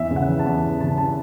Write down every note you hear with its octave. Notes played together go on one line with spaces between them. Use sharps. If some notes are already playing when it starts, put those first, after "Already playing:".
Already playing: E2 E5
C#3
F#5
E3
A5
E2
E2
C#3 A5
E3 A5